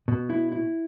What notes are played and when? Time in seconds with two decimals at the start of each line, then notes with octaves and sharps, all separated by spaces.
0.08 B2
0.30 E4
0.52 E4